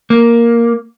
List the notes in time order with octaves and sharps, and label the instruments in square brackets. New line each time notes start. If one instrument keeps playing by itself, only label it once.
[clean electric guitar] A#3